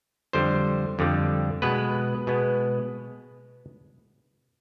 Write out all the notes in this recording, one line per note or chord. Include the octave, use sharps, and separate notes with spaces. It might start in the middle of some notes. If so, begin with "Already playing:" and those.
F2 D3 G3 C5
F2 D3 G3
B2 G#3 B3 B4
B2 G#3 B3